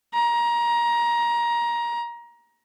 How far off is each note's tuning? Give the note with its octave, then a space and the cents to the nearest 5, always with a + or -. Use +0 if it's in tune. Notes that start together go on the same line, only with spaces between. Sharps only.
A#5 +20